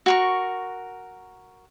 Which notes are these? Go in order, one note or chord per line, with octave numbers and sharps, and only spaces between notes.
F#4 A#4 C#6